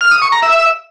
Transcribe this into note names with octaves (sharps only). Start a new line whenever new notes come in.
F6
D#6
C#6
A#5
E5